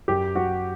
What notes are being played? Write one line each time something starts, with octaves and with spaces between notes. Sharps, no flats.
F#2 G4
F#3 F#4